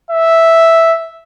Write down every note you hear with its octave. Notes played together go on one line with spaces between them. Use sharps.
E5